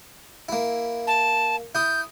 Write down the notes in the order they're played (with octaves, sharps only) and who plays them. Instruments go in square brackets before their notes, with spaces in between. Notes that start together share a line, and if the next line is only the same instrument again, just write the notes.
[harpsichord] A#3 E4
[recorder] A5
[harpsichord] E4 D#6 [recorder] G6